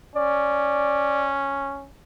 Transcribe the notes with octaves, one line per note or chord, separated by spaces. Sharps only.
C#4 D5